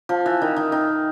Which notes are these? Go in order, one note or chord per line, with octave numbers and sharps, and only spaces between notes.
F3
E3
D#3
D#3
D#3